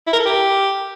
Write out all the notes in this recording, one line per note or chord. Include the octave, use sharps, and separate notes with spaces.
E4
A#4
A4
G4